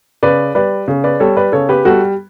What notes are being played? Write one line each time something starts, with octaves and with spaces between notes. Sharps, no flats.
C#3 B4 D5
G3 B4 D5
C#3
B4 D5
G3 A4 C#5
B4 D5
C#3 A4 C#5
G4 B4
G3 F#4 A4